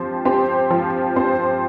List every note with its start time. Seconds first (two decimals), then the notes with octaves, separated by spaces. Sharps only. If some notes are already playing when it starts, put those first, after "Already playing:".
Already playing: F3 C4 G4 C5
0.25 C4 G4 C5
0.70 F3
1.16 C4 G4 C5